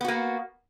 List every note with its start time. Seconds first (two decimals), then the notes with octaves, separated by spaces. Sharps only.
0.01 B3
0.04 F#4
0.08 A#3